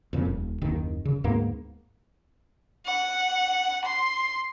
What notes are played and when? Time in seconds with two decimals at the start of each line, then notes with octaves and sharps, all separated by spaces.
0.13 F2 A#2 C#3
0.25 D#1
0.62 F#1 D#2 D#3
1.05 C#3
1.24 D2 G#2 A#3 B3
2.86 F#5
3.85 C6